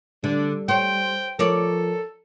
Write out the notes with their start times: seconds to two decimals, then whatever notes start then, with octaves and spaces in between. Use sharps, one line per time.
0.24 D3 G3 D4
0.68 C5 C#5 G5
1.39 F3 A4 A#4 C#5 D5